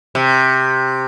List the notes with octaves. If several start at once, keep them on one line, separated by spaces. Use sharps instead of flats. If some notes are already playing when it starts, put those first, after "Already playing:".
C3